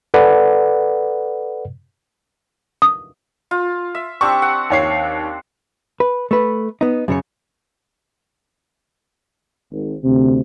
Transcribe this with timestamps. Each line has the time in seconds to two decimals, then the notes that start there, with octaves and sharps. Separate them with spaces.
0.14 A4 B4 D5 F#5
2.82 D#6
3.51 F4
3.95 E5
4.21 C4 D4 G4 C#6 E6
4.42 F#5
4.70 D#2 C#5 C7
6.00 B4
6.31 A3 B4
6.81 B3 D#4
7.08 F#2 C#3 C#5
9.71 G#1
10.04 D2 C3